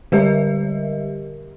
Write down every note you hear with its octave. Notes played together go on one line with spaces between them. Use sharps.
D3 G3 G4 A#4 D#5 E5